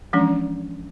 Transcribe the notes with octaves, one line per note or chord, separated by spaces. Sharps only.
E3 F3 G#3 C#4 D4